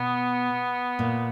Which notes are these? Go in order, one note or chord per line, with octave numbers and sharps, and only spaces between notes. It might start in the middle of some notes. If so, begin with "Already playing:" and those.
Already playing: B2 B3
A#2